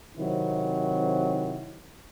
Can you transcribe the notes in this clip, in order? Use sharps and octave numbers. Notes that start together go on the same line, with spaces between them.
C3 D#3 F#3 C4 E4